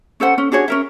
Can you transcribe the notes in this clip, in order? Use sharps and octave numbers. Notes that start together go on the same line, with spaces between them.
C#4 A4 C5 F#5
C#4
D4 F#4 G#4 C#5
C#4 A#4 E5